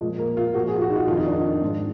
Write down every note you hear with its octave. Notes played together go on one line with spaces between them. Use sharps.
A#2 F3 G#3
A#3
F4
A#2 F3 F#4
G#4
F4
F#4
D#4
F4
F2 D#3 F4
D#4
D4
D#4
G#2 F3